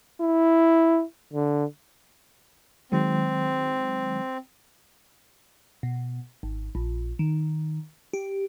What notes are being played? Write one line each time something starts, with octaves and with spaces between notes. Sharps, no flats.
E4
D3
D#3 F#3 G#3 C4
B2
G#1
A#1
D#3
G4